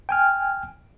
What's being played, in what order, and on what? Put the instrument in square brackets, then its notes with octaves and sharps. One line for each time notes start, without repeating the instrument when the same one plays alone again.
[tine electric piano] G5 G#5 F6